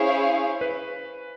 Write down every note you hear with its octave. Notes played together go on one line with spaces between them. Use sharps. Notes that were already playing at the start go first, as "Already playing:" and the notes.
Already playing: C#4 E4 G#4 C5 C#5 F5
B4